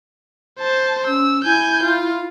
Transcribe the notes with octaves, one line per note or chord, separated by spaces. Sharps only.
C5 A5
C#4 E6
E4 G#5 G6
F4